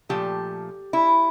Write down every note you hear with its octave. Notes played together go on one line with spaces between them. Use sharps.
A#2 F3 A3 G4
E4